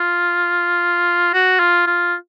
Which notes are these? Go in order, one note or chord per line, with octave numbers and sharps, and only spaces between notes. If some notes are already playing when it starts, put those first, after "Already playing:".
Already playing: F4
F#4
F4
F4